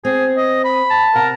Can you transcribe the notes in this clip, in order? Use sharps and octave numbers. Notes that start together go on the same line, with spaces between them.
C4 G#4
D#5
B5
A5
C3 A#4 F#5 A#5